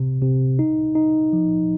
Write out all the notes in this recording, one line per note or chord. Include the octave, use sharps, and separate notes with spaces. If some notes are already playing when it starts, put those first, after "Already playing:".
Already playing: C3
C3
D#4
D#4
F3